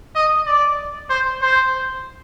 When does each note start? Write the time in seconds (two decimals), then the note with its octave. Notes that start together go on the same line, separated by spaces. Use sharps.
0.15 D#5
0.46 D5
1.10 C5
1.41 C5